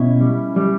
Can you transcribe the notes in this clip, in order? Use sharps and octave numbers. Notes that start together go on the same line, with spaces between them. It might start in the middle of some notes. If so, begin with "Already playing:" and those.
Already playing: B2 C#4 E4
G3
G3